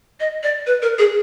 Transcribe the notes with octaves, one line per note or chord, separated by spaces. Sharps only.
D#5
D5
B4
A#4
G#4